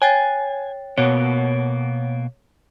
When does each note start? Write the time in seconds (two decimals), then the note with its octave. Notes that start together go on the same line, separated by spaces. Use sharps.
0.02 C#5 G5 G#5 A6
0.98 B2 A#3 B3 C#5